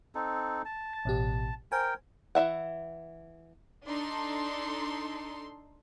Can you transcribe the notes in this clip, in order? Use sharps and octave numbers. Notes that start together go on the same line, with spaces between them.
C4 D#4 A4
A5
A6
A1 B2 G4
A#4 C5 G5 G#5
E3 E4 E5 F#5
D4 D#4 A4 C6